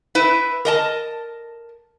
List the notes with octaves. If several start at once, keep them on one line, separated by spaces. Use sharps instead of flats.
E4 B4
A#4 D#5 A5